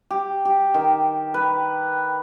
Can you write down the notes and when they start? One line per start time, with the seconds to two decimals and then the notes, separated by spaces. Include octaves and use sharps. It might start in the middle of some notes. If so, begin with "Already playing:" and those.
0.11 G4
0.45 G4
0.74 D#3
1.34 B4